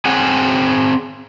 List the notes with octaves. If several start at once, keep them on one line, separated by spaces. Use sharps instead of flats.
C4 G#4 C#5 F#5 G#5